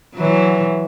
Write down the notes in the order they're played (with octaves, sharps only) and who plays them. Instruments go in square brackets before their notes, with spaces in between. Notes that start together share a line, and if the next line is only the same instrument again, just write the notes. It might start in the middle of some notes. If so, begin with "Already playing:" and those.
[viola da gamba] E3 F#3